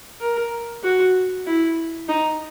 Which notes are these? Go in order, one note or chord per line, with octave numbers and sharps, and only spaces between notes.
A#4
F#4
E4
D#4